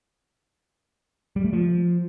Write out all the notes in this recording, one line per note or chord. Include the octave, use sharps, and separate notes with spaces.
G3
A3
F3